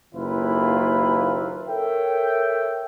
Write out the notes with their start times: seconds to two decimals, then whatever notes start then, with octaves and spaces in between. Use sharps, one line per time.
0.14 F#1 D#2 A#3 E4 F4 B4
1.68 A4 A#4 C#5 E5 G5